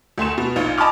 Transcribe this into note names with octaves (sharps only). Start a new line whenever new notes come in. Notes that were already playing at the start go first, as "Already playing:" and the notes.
D2 A3 C6 E7
B2
A#1 D#4 F4
D#5 A5 B5 C6 D6 F6